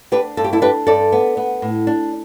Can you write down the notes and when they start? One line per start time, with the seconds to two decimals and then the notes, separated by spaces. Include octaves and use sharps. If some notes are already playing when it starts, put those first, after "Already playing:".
0.12 D4 G4 B4
0.37 G2 A4
0.44 G4
0.53 E4 A4
0.62 D4 G4 B4
0.87 G2 A4 D5
1.12 B3
1.37 B3
1.62 A2
1.87 D4